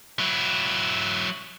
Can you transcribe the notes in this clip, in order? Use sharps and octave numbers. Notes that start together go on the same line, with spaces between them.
F#3 E4